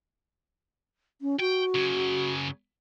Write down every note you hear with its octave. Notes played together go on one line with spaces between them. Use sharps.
C#4
F#4 G5
F#2 C#3